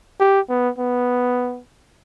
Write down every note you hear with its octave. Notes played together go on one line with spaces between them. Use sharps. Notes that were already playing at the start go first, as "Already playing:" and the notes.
G4
B3
B3